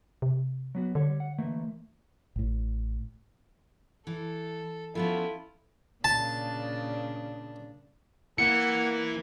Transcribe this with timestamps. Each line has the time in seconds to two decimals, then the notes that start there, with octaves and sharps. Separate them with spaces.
0.22 C3
0.75 F#3 B3 F#4
0.95 D3 G3 C#5
1.20 F#5
1.38 E3 A3 A#3
2.36 A1 A2
4.07 E3 A4
4.95 F3 B3 C#4 E4 F4 A4
6.04 A#2 C#3 D4 A5
8.38 E3 A#3 F#5 C#7